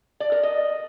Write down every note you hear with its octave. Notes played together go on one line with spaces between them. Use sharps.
D5
A#4
D#5